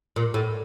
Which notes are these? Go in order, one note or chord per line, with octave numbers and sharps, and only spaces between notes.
A#2
A2